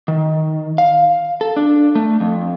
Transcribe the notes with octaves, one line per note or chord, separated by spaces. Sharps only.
D#3
F5
A4
D4
A3
F2